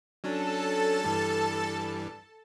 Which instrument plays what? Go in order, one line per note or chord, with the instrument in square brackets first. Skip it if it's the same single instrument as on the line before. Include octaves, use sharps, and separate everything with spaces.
[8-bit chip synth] F#3 C#4 D4 [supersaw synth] A4 A5
[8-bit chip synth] G2 E3 G3